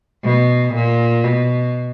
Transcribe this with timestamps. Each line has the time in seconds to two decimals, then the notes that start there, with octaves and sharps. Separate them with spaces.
0.24 B2
0.74 A#2
1.24 B2